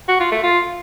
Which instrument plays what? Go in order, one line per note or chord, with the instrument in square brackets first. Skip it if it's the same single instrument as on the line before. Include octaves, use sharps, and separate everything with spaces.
[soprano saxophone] F#4
F4
A3
F4